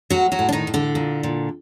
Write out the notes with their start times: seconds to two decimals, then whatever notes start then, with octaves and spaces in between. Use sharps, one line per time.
0.10 A2 F#3 F#4
0.32 F#3 F#4
0.39 A2
0.49 D4
0.52 D#3 D#4
0.67 A2
0.74 D3 D4
0.95 A#2
1.23 A#2